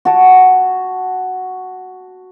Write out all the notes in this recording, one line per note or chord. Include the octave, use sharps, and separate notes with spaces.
F#4 A5